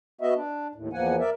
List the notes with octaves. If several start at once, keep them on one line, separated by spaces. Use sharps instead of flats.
B3 F#4 D#5 E5
D4
D#2 A2
E2 F3 A#3 F#5 G#5
A#4 D5 E5